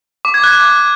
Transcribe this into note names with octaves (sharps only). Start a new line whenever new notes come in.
D6
G#6
F#6